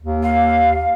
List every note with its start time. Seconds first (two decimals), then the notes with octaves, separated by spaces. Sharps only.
0.01 D#2
0.23 F5